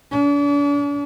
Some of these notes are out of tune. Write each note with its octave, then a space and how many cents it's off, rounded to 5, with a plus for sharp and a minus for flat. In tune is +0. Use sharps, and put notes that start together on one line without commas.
D4 -40